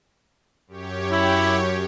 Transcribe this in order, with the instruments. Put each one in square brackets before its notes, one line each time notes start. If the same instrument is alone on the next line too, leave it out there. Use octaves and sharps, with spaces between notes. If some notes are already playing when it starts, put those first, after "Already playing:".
[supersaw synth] F#2 G4 C#5
[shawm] E4